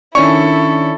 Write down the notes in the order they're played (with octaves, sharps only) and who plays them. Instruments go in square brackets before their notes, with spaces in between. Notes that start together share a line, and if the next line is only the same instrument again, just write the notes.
[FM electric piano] D#3 C#4 D4 [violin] E4 A4 [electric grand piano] C#6